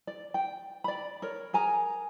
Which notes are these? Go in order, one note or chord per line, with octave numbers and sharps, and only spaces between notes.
D5
G5
D5 B5
A#4 C#5
G#4 A#4 G#5 A#5